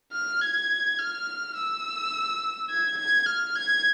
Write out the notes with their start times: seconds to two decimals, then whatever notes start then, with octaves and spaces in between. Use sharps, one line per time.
0.13 F6
0.41 G#6
0.99 F6
1.57 E6
2.70 G#6
2.98 G#6
3.27 F6
3.56 G#6